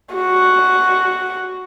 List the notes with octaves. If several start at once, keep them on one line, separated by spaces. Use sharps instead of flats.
F#4